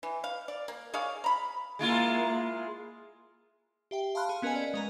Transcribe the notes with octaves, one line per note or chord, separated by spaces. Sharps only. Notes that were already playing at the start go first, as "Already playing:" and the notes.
E3
F5
D5
A#3
G#4 C#5 D5 F5
A#5 B5
G#3 A#3 E4 F4
G4 E5 G5
F5 A5 B5 C6 F6 F#6
G#4
B3 C#4 A#4 B4 D#5 G#5
D5
G#3 A#4 A#5